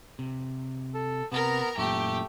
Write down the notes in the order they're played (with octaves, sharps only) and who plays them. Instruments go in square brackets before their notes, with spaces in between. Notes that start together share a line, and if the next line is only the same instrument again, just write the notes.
[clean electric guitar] C3
[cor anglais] A4
[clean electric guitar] C3 [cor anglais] B3 [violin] A#4 A#5
[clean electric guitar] F#2 A#2 [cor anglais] A3 [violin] G4